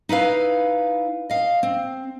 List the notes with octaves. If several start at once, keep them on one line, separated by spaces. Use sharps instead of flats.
D#4 E4 B4 F5
D#5 F5
C4